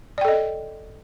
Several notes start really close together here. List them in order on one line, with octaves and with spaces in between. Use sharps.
D5 G5 A4 D#5